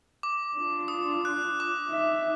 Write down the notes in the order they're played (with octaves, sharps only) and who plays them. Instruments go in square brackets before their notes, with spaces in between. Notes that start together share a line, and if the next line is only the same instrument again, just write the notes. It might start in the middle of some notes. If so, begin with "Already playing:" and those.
[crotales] D6
[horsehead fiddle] D4 F4
[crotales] D#6
F#6
D6
[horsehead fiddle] D#4 E5